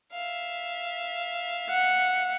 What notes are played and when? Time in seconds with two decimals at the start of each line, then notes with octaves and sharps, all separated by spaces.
0.12 E5 F5
1.70 F#5